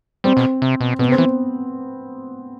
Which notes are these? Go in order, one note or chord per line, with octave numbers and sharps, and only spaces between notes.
G3 C4
B2
C3
B2
B2 B3
C3
C4
E3